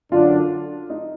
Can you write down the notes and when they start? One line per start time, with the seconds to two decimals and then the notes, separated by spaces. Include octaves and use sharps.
0.12 F#2 D3 F#3 D4 F4
0.90 D#4